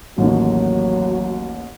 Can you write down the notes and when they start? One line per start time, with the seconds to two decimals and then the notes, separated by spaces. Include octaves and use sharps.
0.18 A1 D#2 F#3